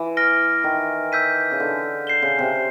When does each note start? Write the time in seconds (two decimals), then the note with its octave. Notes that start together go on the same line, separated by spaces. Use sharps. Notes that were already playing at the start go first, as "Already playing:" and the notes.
Already playing: E3
0.17 F6 A#6 D7 G7
0.64 D#3
1.12 E6 G6 B6 D#7
1.52 C#3
1.60 D3
2.07 G6 C7 E7 G7
2.22 C#3
2.39 C3